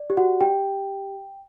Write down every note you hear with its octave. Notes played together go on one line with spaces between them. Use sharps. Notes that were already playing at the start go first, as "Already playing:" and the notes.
Already playing: D5
G4
F#4 F#5
G4 G5